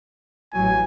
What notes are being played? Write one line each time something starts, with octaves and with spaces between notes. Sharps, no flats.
A1 F#3 G#5